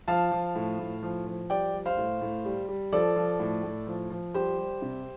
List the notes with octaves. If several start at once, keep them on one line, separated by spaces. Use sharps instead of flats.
F3 F5 A5
F3
A2
A2
F3
F3
G3 D5 G5
G3
C5 F5
A2
A2
G3
G3
F3 A4 D5
F3
A2
A2
F3
F3
G3 G4 C5
G3
C3